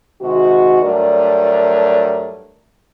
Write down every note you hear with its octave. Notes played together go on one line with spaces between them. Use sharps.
C3 D#3 G#3 F#4
G2 F#3 A3 A#4 D5